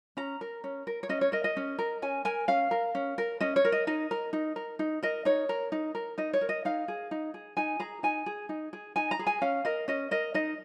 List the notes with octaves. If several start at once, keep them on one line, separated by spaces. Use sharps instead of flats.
C#4 A#5
A#4
C#4
A#4
C#5
C#4 D#5
C#5
A#4 D#5
D#5
C#4
A#4
C#4 G#5
A#4 G#5
C#4 F5
A#4
C#4
A#4
C#4 D#5
C#5
A#4
D#5
D#4 D#5
A#4
D#4
A#4
D#4
A#4 D#5
D#4 C#5
A#4
D#4
A#4
D#4 D#5
C#5
A#4
D#5
D#4 F5
G#4
D#4
G#4
D#4 G#5
G#4 A#5
D#4 G#5
G#4
D#4
G#4
D#4 G#5
A#5
G#4
G#5
C#4 F5
A#4 D#5
C#4 D#5
A#4 D#5
D#4 D#5